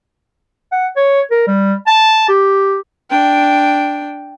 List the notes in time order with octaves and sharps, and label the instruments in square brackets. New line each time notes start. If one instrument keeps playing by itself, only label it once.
[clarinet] F#5
C#5
A#4
G3
A5
G4
[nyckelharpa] D4 G5